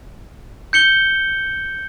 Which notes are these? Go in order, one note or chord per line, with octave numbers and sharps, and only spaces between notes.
G6 C#7 G7